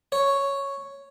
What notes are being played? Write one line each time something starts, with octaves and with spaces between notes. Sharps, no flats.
C#5